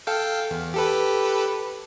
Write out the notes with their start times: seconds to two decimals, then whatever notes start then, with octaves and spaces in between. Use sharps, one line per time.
0.07 A4 F5 G5
0.51 E2
0.74 G4 A4 B4